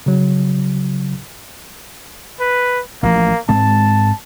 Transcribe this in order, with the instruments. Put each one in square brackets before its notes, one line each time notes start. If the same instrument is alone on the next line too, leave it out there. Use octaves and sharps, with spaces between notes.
[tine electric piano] C#3 F#3
[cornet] B4
[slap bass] A1 F3 [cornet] A#3
[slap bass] G#2 G#3 C4 [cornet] A5